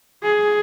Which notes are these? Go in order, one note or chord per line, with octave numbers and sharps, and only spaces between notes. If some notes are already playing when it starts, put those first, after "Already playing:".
G#4